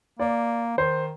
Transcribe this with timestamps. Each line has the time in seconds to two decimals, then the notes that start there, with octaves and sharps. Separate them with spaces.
0.20 A#3 D5
0.78 D#3 C5